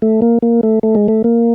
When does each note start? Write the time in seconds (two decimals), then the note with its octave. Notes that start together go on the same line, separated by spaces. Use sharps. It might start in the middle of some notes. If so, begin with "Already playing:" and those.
0.02 A3
0.22 A#3
0.42 A#3
0.63 A3
0.83 A3
0.95 G#3
1.08 A3
1.24 A#3